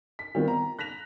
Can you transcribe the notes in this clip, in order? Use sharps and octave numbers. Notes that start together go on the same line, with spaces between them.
B6
D#3 G3 B3 C4 D#4 F4
A#5
F#6 A#6 B6 F7